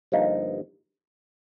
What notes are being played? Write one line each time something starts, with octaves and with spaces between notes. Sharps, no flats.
G1 G2 F3 A#3 D#4